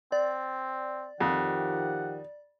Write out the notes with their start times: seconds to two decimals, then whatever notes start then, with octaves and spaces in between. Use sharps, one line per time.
0.12 C4 D5
1.20 F2 D#3 F3 G4 F#5